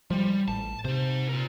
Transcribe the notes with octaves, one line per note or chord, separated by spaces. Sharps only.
F3 G3 G#3
A1 A5
C3 D#4 C5
F4 A#4